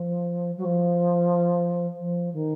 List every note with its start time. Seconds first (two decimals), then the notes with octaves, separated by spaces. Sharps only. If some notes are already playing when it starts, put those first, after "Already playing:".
Already playing: F3
0.57 F#3
0.64 F3
1.99 F3
2.33 D#3